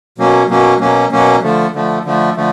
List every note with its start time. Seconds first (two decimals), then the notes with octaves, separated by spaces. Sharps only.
0.18 B2 F#3 A#3 C#4
0.49 B2 F#3 A#3 C#4
0.80 B2 F#3 A#3 C#4
1.11 B2 F#3 A#3 C#4
1.43 D3 F3 A3
1.74 D3 F3 A3
2.05 D3 F3 A3
2.37 D3 F3 A3